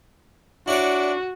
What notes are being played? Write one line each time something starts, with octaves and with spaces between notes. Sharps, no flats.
D4 E4 F#4 C#5 D5